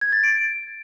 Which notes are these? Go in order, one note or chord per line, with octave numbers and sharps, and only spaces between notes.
G#6
A6
D7